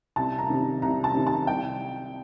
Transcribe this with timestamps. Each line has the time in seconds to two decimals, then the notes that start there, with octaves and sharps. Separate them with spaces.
0.16 C2 A5
0.38 A#5
0.50 C3 D#3
0.82 C2 A#5
1.04 A5
1.14 C3 D#3
1.27 A5
1.47 C2 G5